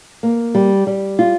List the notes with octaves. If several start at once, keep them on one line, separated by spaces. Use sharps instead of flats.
A#3
G3
G3
F4